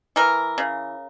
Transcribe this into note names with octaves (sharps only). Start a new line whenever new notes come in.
E3 A#4
C#3